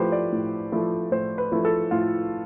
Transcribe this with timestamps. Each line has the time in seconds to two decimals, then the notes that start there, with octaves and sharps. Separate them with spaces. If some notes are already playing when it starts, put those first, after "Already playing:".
Already playing: A2 F3 A3 E4 G4 B4 C5
0.12 D5
0.32 A2
0.72 F3 A3 E4
1.12 A2 C5
1.38 B4
1.52 F3 A3 E4
1.65 A4
1.91 A2 F4